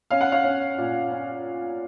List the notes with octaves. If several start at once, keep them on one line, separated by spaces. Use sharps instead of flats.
C#4 F5
F#5
C#5 F5
C#4
A#2
C#4